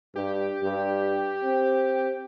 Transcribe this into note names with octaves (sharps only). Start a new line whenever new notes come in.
G2 G4
G2
C4